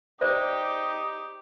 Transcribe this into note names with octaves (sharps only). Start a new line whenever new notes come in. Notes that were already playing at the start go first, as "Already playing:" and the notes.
D#4 G4 C5 D5 E5